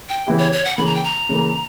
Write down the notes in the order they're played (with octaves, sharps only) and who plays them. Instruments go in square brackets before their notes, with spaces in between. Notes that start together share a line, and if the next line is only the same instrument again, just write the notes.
[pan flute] G5
[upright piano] C#3 E3 B3 E4 G4
[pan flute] C#5
C#5
F#5
[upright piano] C#3 E3 A#3 [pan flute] B5
[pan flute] A#5
G5
A#5
[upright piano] C#3 E3 A#3